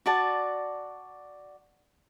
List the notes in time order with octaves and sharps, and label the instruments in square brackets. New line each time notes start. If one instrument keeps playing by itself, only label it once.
[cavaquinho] F#4 D5 A5